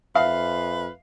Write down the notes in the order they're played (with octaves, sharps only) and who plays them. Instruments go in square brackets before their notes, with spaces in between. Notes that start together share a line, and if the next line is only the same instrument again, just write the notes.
[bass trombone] F2 [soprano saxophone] B4 [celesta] E5 [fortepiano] F5